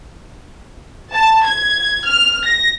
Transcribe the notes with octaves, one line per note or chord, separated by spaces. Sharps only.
A5
G#6
F6
A#6